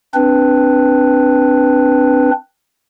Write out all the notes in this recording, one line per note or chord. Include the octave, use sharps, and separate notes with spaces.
C4 D4 B4